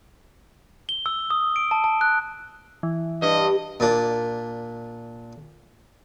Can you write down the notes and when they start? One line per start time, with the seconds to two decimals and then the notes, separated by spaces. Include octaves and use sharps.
0.89 G7
1.06 E6
1.30 D#6
1.56 D7
1.71 A5
1.84 A5
2.01 F#6
2.83 E3
3.22 G2 D#5
3.80 A#2 D4